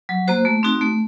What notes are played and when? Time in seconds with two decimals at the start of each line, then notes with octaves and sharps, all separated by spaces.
0.09 F#3
0.28 A#3 F#4 C5
0.45 A3
0.63 C4 D#4 F#4
0.81 A3